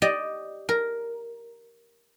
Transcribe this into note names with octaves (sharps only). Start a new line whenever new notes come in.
G4 D5 D#5
A#4